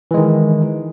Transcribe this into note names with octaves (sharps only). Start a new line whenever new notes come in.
D#3 E3 G#3